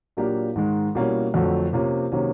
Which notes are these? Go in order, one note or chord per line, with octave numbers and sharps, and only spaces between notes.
A#2 F#3 A#3 D4 G4
G#2 D#3 G#3
B2 G3 A#3 C#4 E4
F2 D3 F#3 A3
C3 F3 A#3 C#4
C3 D#3 F#3 A#3 C#4